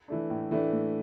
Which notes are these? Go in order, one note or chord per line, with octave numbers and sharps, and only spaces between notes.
E3 A3 D4
A2
E3 A3 D4
A2